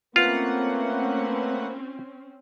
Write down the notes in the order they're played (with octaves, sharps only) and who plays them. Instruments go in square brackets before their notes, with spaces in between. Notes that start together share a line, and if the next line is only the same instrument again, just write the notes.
[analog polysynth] A3 B4 F#5 [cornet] A#3 [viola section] C4 C#4 [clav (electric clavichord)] F4